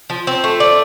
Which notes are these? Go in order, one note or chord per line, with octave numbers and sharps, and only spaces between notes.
F3
C4
A3
D5